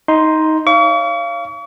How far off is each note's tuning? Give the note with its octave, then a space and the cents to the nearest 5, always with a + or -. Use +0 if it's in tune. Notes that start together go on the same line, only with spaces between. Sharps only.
D#4 +15 C6 +0
C#5 -5 F5 -25 C#6 +45